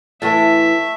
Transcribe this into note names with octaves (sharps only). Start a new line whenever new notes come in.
A2 E3 A3 E5 A5